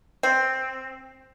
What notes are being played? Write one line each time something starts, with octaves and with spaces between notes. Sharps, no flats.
C4